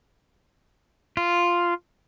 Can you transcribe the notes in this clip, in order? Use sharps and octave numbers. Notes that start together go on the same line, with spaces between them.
F4